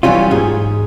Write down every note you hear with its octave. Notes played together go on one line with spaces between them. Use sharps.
E3 F#3 G3 C#4 F4
G#2 G#4